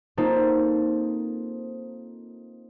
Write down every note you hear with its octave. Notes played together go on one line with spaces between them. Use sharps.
A#3 C4 D#4 F4 A4 C5